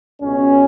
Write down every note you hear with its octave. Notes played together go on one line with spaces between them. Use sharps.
C#2 B2 C#4